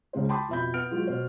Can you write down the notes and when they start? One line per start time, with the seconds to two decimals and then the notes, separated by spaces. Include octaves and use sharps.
0.13 C#2 C#3 G#3 C5
0.29 G5 A5 B5 C6 D6 D#6
0.49 F2 B2 E5 B5 G6
0.74 B3 F6 D7
0.91 F#3 G#3 F4
1.07 B2 C5